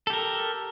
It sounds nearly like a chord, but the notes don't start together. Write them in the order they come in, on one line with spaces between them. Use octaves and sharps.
A4 G4 A#4